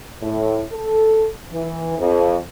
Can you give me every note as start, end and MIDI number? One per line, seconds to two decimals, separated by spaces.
0.22 0.63 45
0.72 1.27 69
1.52 1.98 52
1.98 2.38 41